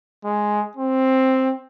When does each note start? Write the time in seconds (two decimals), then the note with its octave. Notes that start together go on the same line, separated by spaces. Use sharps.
0.25 G#3
0.77 C4